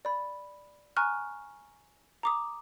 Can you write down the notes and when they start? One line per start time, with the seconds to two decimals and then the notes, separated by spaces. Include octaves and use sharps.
0.05 D5 B5
0.96 G#5 A#5 C#6 F6 F#6
2.23 A#5 D6 D#6